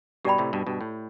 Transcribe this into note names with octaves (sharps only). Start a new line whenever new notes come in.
G2 B2 G4 D5 G5 B5
A2 C3
G2 B2
G2 B2
A2